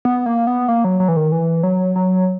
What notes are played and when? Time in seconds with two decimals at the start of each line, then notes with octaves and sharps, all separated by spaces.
0.05 B3
0.26 A#3
0.47 B3
0.68 A#3
0.84 F#3
1.00 F#3
1.08 E3
1.16 D#3
1.32 E3
1.63 F#3
1.96 F#3